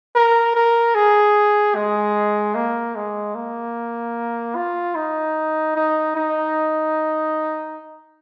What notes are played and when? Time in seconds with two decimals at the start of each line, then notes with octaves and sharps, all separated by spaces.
0.15 A#4
0.55 A#4
0.95 G#4
1.75 G#3
2.55 A#3
2.96 G#3
3.35 A#3
4.56 F4
4.96 D#4
5.76 D#4
6.15 D#4